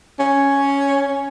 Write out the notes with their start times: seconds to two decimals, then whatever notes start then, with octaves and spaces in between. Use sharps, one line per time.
0.19 C#4